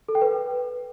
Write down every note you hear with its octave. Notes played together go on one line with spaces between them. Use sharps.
A4
G5
B4